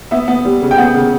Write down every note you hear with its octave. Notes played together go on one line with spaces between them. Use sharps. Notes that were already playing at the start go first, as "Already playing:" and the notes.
B3 E5
B3
G3
C#3
G5
B3 F#5
C#3